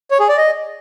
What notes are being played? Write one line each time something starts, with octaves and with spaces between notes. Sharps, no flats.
C#5
G#4
D5
D#5